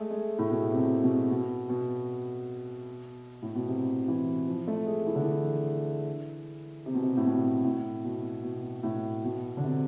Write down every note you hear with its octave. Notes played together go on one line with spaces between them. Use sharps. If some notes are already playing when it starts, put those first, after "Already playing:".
Already playing: G#3 A3
G#3
A2
B2
C3
B2
B2
B2
B2
A2
B2
C3
E3
F3
A3
G#3
E3
D3
E3
C3
B2
C3
A2
B2
A2
B2
B2
A2
B2
D3
C3